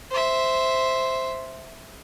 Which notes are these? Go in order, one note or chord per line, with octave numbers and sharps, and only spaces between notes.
C5 E5